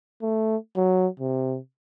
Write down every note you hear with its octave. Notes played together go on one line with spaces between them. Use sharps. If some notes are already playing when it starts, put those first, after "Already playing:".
A3
F#3
C3